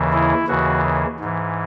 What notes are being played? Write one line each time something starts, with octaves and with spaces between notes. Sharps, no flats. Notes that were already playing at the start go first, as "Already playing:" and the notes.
Already playing: D#2 C#3 E3
E4
D#2 C#3 E3 F#4
G#2 E3